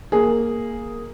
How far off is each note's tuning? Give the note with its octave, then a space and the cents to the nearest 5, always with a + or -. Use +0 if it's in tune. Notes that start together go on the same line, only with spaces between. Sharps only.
A#3 +0 G#4 +0